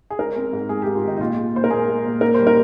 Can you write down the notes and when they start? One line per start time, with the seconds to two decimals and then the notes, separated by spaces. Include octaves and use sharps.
0.11 G#4
0.19 G#3 A#4
0.36 C4
0.53 G#2
0.69 G#2 G#4
0.82 G#2 G4
0.95 F4
1.04 D#3 D#4
1.17 D#4
1.20 A#2 F4
1.37 G#3
1.55 A#2 C5
1.64 A#4
1.71 A#2 G#4
1.87 G#3
2.05 A#2
2.21 A#3 A#4
2.34 G3 C5
2.47 A#4